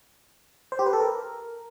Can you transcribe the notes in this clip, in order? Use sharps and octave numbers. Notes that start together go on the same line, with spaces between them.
C5
G4
B4
A4
A#4